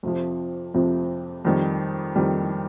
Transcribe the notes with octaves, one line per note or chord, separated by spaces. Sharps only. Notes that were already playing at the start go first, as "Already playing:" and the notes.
F2 C3 F3
F2 C3 F3
F2 D#3 G3
F2 D#3 G3